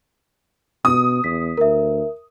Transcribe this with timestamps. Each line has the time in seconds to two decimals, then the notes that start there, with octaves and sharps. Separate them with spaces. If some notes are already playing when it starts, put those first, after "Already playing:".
0.85 B2 D#6
1.24 E2 B6
1.57 D2 A#4 E5